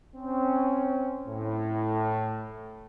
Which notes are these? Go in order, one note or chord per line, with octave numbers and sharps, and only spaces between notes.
C4 C#4
A2